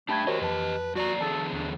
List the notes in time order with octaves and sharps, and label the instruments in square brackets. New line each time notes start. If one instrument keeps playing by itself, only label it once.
[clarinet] A3 [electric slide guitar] D4 G4 G5 [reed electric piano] A5 B5 G#6
[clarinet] F#4 [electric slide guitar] G4 D#5 [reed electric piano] A#4 C5 C#5
[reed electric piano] F2 A5 [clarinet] B4
[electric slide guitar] F#2 D5 A#5 [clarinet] F#4
[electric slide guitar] E2 D3 G#4 [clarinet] A4 [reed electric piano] A5
[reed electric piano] D#2 [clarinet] D4